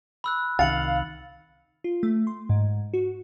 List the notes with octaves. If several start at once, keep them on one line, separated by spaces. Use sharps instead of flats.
B5 E6 F#6
C2 D#3 F5 A6 C#7 F#7
F4
A3
C6
G#2
F#4